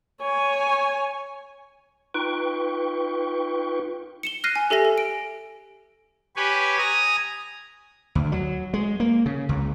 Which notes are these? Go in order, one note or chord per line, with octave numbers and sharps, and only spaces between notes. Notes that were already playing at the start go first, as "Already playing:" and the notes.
C#5 G#5
D#4 F4 B4 G5 C#6
C#7 E7 G7
F6 F#6 A#6 C7 D#7
G#5
G4 A4 E5 G#5 A#6
A4
D7
G4 B4 C#5 G#5
G#5 A#5 D#6
D2
F#3
G#3
A#3
C#3
C#2